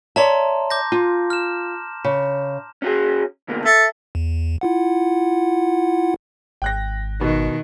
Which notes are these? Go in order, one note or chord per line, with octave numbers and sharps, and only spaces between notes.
C#5 D5 E5 A5 A#5 C6
D6 G6 A#6
F4
F6 E7
C#3
C#4 F#4 G#4
D2 B2 A#3
A4 E5
E2
E4 F4 F#5
G#1 G5 F#6 A#6
B2 D#3